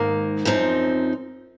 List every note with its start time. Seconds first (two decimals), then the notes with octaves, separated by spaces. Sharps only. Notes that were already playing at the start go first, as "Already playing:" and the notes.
Already playing: G#2 D#3 A#3
0.45 F#2 F3 C4 D#4